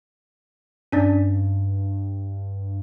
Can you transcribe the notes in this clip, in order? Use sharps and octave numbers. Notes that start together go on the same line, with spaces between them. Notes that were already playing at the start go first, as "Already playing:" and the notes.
G2 C#4 D4 D5